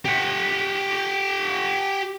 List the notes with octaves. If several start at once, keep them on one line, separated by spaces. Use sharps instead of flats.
G4 F#5